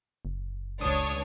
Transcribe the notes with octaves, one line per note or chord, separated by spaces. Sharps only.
F#1
C#2 D4 C#5 D#6